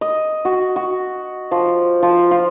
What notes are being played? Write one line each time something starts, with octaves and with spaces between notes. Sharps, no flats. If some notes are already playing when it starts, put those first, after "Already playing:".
D#5
F#4
F#4
F3
F3
F4